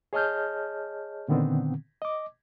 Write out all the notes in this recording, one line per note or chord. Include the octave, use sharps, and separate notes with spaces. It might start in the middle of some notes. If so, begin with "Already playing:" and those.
G#4 C#5 D#5 A5 F6 G6
A#2 D3 D#3 B3 C4
D#5 D6